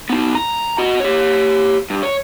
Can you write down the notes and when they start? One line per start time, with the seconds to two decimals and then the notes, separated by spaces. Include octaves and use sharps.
0.09 B3 D#4
0.35 A#5
0.78 F#4 D#5
1.00 G4 C#5
1.90 G2
2.03 C#5